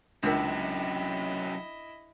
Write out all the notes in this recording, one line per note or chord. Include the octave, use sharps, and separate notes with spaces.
C#2 F#2 C3 D4 E4 A#4 D#5